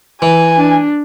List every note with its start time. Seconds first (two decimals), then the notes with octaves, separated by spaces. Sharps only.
0.22 E3 G#5
0.57 D4